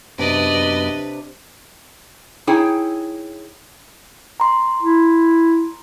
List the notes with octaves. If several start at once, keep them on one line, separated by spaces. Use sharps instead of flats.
F#2 C3 B3 D4 B4 D5 D#5
D#4 E4 G#4 C#5 G5 G#5
A#5 C6
E4